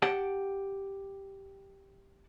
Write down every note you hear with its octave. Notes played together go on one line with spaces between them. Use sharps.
G4 F#5 G5 A5